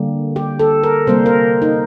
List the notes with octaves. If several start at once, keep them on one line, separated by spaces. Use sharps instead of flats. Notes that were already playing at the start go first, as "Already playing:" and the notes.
Already playing: D3 G3 A#3
G4
A4
A#4
C3 G3 A#3 C5
A#4
D#4